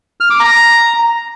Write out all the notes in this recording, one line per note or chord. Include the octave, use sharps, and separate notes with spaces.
F6
D6
A#5